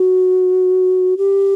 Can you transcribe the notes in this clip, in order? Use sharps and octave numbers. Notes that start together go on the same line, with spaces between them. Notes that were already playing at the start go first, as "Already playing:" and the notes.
Already playing: F#4
G4